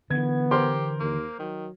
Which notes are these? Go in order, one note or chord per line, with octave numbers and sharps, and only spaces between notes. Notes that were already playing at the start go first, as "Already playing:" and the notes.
D3 E3 B3 G#6
G4 A#4 C5 C6
D#2 A#3
D#3 F#3